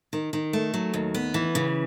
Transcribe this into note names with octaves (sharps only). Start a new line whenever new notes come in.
D#3
D#3
A3
F#3
D#2
B3
E3
C#3